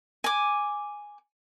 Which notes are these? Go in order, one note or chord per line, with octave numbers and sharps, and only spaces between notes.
G#5 D6